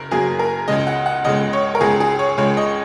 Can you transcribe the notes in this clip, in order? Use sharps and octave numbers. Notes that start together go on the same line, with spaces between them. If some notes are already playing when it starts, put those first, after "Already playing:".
Already playing: F#1 F#2 A#4
F#1 F#2 F#3 A#3 G#4
A#4
C#2 C#3 G#3 D#5
F#5
F#5
C#2 C#3 G#3 D#5
C#5
A#4
C#2 C#3 G#3 G#4
G#4
C#5
C#2 C#3 G#3 C#5
D#5